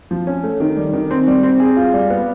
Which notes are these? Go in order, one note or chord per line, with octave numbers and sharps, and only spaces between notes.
F3
C#4
A3
D#3
G3
D#3
C4
G3
C4
G#4
F4
G3
B3